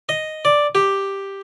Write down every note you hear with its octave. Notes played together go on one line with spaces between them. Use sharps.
D#5
D5
G4